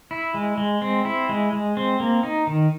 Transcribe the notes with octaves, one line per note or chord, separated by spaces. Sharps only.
E4
G#3
G#3
C4
E4
G#3
G#3
C4
A#3
D#4
D#3